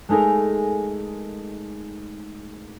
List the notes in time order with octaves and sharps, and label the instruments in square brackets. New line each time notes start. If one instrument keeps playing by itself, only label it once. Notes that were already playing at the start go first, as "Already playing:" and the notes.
[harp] G#3 A3 D#4 G#4 A#4